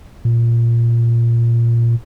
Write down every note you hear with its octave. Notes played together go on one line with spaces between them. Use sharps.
A#2